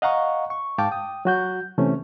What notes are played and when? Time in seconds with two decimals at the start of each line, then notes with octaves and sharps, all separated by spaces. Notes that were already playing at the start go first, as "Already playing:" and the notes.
0.02 D#5 F5 F#5 A#5 C#6
0.50 C#6
0.78 G#2 F5 G5 A5 D6
0.91 G5 D#6
1.25 F#3 F#4 G6
1.78 C3 E3 A3 C#4